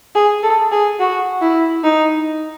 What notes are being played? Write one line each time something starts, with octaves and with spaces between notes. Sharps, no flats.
G#4
A4
G#4
F#4
E4
D#4